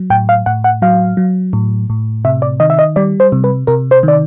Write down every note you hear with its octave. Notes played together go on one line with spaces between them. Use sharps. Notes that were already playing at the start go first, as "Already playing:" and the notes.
Already playing: F#3
A2 G5
F5
A2 F#5
F#5
F#3 F5
F#3
A2
A2
C3 E5
D5
D#3 D#5
E5
D#5
G3 D5
C5
C3
B4
C3 A#4
C5
D#3 D5